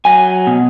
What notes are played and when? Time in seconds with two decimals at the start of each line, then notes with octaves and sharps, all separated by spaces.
0.05 F#3 G#5
0.47 B2